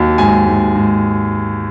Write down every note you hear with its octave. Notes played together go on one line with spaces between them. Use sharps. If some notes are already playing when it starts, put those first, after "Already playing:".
Already playing: D#2 F#3
G#2 G#5
G#2
G#2